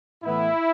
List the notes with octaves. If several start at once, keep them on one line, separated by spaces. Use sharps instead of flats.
A2 E3 B3 E4